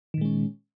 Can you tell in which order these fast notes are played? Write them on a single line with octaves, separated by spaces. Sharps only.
D#3 A#2 G#3 C#4